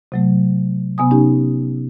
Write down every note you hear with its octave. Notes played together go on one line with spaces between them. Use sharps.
C3 F#3 A3
C3 B3 G#5 D#6
C#4 D#4 G4